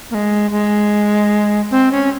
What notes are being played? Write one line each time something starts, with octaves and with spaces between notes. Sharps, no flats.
A#3
G#3
G#3
C4
C#4